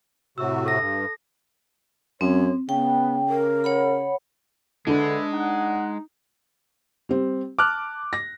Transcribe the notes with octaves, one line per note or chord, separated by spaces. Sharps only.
A2 C3 F#4 E6
A4 A#6
G2
F#2 C4 C#5
C#3 B3 G5
A#4
C#5 F#5 B5
D3 G#3 D4 B4 E5 B5
D#4 F#5
G3 C4
A5 D6 F6 F#6
A#6